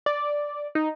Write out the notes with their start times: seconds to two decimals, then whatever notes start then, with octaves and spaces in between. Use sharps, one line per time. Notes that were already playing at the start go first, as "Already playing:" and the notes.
0.06 D5
0.75 D#4